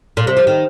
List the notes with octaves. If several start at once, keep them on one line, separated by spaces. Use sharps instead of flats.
A#2
C3
F3
D#3